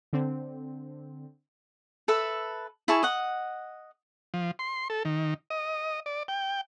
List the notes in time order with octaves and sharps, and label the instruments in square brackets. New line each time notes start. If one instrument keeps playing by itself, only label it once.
[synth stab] D3 C4
[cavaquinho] A4 B4 E5
E4 G#4 A5 C#6
D#5 F#5
[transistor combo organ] F3
C6
A4
D#3
D#5
D5
G5